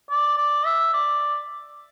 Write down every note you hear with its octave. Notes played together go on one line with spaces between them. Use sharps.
D5
D5
E5
D5